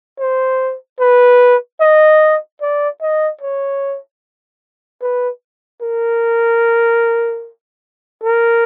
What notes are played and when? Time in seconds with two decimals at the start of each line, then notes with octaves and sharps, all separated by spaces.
0.19 C5
1.00 B4
1.81 D#5
2.61 D5
3.01 D#5
3.41 C#5
5.01 B4
5.82 A#4
8.24 A#4